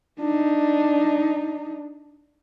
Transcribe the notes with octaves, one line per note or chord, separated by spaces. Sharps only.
D4 D#4